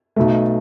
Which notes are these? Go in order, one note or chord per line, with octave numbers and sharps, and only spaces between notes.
B1 B2 A3